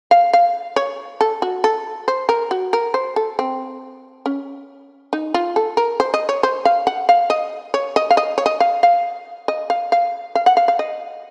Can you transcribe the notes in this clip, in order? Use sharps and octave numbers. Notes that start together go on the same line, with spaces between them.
F5
F5
C#5
A4
F#4
A4
C5
A#4
F#4
A#4
C5
A4
C4
C#4
D#4
F4
A4
A#4
C5
D#5
C#5
C5
F5
F#5
F5
D#5
C#5
D#5
F5
D#5
C#5
D#5
F5
F5
D#5
F5
F5
F5
F#5
F5
F5
D#5